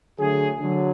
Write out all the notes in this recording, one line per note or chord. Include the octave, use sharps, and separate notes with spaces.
D3 F#3 A3 G#4
D3 F#3